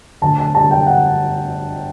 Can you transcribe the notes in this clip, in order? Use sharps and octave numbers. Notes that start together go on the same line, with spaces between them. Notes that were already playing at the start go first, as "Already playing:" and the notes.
D2 A5
A5
D3 G3 A5
G5
F#5